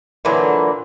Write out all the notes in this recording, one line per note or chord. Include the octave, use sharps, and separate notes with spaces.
A#2 D3 E3 F#3